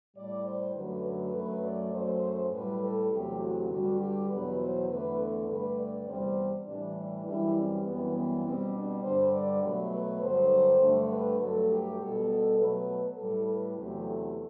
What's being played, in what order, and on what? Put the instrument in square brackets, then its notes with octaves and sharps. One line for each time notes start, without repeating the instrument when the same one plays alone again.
[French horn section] A2 G3 D5
C5
F#2 D3 F#3 A3 B4
B4
F#2 F#3 A3 B4
D5
F#2 F#3 A3 C5
A2 G3 B4
A4
E2 C3 F#3 A3 G4
F#4
G2 D3 G3 F#4
G4
E2 B2 F#3 B4
C5
E2 D3 A3 B4
A4
G2 D3 A3 B4
D5
E2 C3 G3 C5
A2 E3 G3 D4
D4
F#2 E3 G3 E4
C4
F#2 E3 G3 B3
B3
B2 G3 C4
D4
G2 D3 G3 C5
D5
B2 F#3 A3 B4
B4
G2 D3 F#3 C5
G2 D3 A3
B4
G2 F#3 A3 A4
G4
B2 G3 A4
B2 F#3 A3 B4
A2 G3 A4
B4
E2 C3 F#3 A3 G4
A4